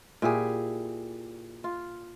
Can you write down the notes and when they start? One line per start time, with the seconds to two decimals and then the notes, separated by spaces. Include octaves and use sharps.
0.22 A#2 E4 G4 G#4
1.64 F4